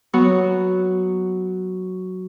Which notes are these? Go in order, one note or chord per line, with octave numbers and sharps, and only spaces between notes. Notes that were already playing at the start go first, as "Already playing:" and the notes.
F#3 B3 F#4